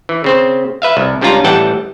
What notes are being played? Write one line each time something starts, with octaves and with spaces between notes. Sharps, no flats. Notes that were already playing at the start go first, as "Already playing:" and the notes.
E3
C#3 C4 C5
B4 E5 F5
C2
C#2 G3 C#4 D4 F4 A#5
A1 E3 G3 F#5 G5 A5